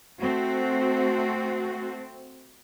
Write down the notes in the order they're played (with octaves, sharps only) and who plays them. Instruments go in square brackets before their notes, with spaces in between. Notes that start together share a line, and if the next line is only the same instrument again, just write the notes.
[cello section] A3 C4 F#4